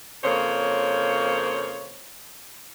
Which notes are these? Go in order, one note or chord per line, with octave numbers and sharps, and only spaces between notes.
F2 C#3 A#3 C5 C#5